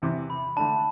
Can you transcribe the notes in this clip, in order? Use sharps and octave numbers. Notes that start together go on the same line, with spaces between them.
E2 C3 E3
B5
D3 A3 D4 A5